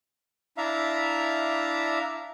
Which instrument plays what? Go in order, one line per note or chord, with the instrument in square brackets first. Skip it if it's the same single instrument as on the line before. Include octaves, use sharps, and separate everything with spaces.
[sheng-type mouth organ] D4 E4 E5 F5 A#5